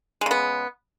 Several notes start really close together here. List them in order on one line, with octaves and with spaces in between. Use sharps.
G#3 C#3 B3